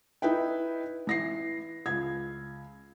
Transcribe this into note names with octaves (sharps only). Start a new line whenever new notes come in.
D#4 E4 B4 G5
E3 A#6 C7
C#2 G#6